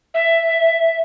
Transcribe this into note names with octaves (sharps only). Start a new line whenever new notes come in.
E5